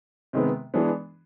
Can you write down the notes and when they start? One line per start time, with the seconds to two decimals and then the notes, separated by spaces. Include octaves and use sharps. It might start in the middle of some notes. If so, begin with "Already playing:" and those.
0.33 C3 D#3 G#3 B3
0.74 E3 G#3 B3 D4